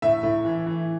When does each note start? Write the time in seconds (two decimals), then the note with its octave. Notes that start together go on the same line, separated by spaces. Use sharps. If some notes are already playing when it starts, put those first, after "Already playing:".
0.02 A2 E5
0.23 A2
0.45 E3
0.66 E3